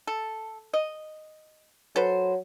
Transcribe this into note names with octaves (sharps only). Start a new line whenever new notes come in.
A4
D#5
F#3 A4 B4 C5